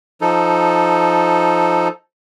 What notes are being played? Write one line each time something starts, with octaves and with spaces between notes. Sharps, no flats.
F3 D#4 A4